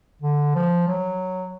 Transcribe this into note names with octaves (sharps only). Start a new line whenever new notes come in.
D3
F3
F#3